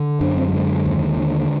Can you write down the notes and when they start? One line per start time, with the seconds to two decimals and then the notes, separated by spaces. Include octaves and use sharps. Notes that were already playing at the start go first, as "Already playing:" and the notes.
Already playing: D3
0.21 F#2 D4
0.37 C4
0.48 G3
0.53 D3 G#3
0.85 D#2
1.18 D3